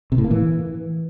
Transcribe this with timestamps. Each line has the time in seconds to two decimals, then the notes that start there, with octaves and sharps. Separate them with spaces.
0.12 C3
0.18 A2
0.24 A#3
0.31 E3